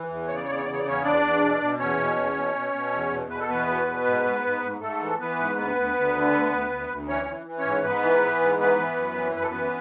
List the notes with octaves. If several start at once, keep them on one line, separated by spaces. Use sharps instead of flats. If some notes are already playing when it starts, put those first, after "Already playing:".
Already playing: E3
E2
C#3 C#5
D5
C#5
E2 D5
C#5
C#3 D5
C#5
D5
E2 C#4 C#5
E2 D4 D5
E2
B2
B2
E2 C#4 C#5
B2
E2
B2
B2
B2
E2
B2
B2 B4
A4
E2 B3 B4
B2
B2
G#2
G#2
G#2
G#2
G#2 A3 A4
E3
E3 B3 B4
G#2
D2 B3 B4
D2
D2
D3
D2
D2
D2
D2
E3 C#4 C#5
E3
E3
C#4 C#5
G#2
G#2 B3 B4
E3
E3
G#2
E3 B3 B4
E3
F#2
E3
F#2 B4
A4
E3 B3 B4